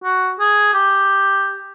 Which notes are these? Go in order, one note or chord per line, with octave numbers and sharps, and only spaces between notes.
F#4
G#4
G4